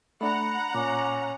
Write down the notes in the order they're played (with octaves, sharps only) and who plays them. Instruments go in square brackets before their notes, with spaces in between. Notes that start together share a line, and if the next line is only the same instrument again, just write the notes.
[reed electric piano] A3 D4 [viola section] F#5 A#5 [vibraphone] B5
[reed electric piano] A#2 [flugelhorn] C#4 [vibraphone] D6